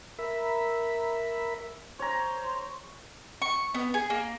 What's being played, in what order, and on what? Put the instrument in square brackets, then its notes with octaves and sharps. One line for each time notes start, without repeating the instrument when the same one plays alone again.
[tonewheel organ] A#4 E5 B5
[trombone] C5 [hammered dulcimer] C#5 A#5
[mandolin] C#6
B3
G#4
A#3